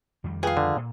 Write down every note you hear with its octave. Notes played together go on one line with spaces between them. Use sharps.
F2 D#3 G3
F4 G#4 B4 F5 G5
D3
A#2